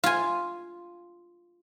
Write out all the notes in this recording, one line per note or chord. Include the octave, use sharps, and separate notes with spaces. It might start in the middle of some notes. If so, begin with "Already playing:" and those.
F4 G#5